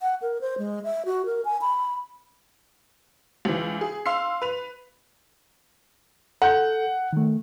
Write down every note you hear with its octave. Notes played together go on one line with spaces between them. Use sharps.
F#5
A#4
C5
G#3
E5
F#4
A#4
G#5
B5
C#2 E3
G#4
F5 C6 E6 C7
B4 F7
A4 F#5 G6
D#3 A3